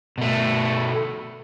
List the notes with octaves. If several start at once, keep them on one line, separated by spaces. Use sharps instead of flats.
B2 A3